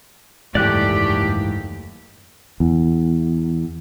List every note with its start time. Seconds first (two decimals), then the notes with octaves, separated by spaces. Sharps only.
0.55 F#1 D#2 G#2 E3 A3 G4 D5 F#6
2.60 E2